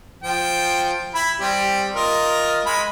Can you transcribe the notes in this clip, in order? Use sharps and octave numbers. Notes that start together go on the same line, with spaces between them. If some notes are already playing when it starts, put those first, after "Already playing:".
F3 G5
E4 B5
G3 C4 G4
F4 A#4 D#5
G#3 B5